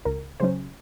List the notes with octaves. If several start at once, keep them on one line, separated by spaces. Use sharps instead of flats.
C#2 A#4
C#3 F#3 C#4 C5